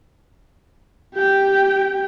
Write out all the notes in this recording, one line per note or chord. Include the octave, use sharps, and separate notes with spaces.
G4 G5